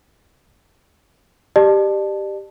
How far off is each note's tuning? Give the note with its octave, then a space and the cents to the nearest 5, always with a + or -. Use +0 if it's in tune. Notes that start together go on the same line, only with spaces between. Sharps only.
G4 +0 D5 +40 A5 +0